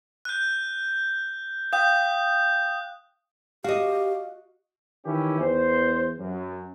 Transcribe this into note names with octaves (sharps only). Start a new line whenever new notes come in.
F#6 G6
F5 G5 D#6 G6
F#4 G4 D#5 F5
D#3 E3 C#4 E4 G4
E2 C5
F#2